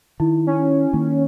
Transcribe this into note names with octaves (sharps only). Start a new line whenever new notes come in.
D#3 E4
C#4
D#3 A#3